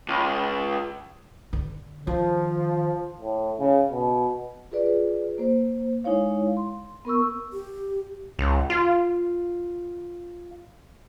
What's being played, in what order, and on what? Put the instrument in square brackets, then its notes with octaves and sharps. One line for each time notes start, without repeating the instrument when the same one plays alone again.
[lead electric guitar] C#2
[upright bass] D3
[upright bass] D#3 [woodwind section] F3
[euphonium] A2
C#3
B2
[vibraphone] F4 G#4 B4 D5
A#3 C5
G#3 D#4 E4 C#5 F5
C6
B3 A#4 C#6 E6
[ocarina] G4
[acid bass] C#2
F4